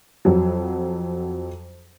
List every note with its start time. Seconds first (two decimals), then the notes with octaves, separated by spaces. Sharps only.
0.25 F2 F#3